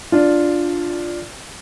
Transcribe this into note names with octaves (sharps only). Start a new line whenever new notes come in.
D4 F4